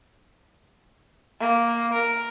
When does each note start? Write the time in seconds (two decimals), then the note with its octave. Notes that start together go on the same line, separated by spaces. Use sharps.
1.40 A#3
1.93 A#4